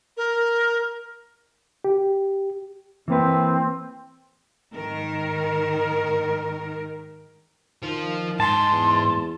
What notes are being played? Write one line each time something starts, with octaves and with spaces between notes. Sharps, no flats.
A#4
G4
E3 A#3 C4 B4
G#2 D#3 A#4
D#3 F3 F4
G#2 A5 C6
E2